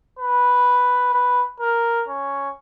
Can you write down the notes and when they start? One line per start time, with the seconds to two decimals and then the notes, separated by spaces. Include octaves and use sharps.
0.19 B4
1.14 B4
1.60 A#4
2.08 C#4